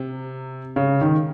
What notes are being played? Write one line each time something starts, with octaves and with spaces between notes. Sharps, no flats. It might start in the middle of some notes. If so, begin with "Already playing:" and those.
Already playing: C3
C#3
D#3